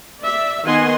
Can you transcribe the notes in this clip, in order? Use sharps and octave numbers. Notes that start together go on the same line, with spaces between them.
D5 E5
D#3 B3 D#5 F#5 G#5 C6